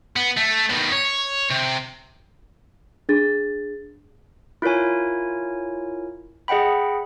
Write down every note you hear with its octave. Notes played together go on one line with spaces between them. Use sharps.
B3
A3
D#3 B3
C#5
C3
D4 G#4 A6
E4 F4 A#4 C#5 G#5
G#4 D#5 F#5 G5 B5